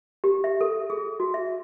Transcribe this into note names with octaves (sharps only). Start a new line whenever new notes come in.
G4
E5
A4
G#4
F#4
E5